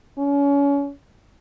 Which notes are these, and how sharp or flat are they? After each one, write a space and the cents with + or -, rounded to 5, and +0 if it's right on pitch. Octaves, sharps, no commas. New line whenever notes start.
C#4 +30